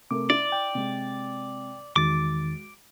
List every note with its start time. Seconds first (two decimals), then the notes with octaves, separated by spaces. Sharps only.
0.11 C3 A3 A#4 D6
0.30 E4 D5
0.52 G5
0.75 C3 G#3
1.96 E2 D#3 G#3 F#4 D6 A6